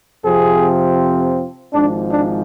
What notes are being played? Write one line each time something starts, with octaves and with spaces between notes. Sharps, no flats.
F2 C3 F3 C4 G#4
G#1 G#2 F3 D4
D4